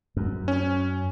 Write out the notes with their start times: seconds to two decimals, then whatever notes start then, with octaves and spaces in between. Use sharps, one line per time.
0.17 F#2
0.48 C#4